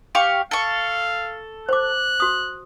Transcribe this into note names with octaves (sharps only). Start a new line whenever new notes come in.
G4 F5 C#6
A4 F5 C#6
C5 D6 F#6
F#4 D#6